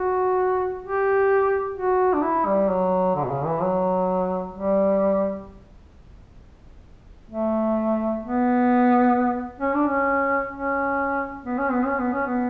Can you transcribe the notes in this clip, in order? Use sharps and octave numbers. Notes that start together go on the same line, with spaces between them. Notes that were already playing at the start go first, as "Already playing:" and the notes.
Already playing: F#4
G4
F#4
D4
E4
G3
F#3
D3
B2
C#3
E3
F#3
G3
A3
B3
C#4
D4
C#4
C#4
B3
C#4
B3
C#4
B3
C#4
B3